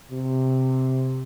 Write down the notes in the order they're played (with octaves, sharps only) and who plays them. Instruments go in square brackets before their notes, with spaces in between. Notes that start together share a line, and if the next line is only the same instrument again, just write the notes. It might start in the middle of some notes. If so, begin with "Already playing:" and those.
[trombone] C3